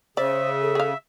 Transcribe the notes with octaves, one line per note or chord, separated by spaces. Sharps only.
C#3 C5 D5 E5
A4
G#4 F5